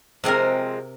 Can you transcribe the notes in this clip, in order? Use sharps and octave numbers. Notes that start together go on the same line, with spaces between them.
C3 F3 G#3 C4 A#4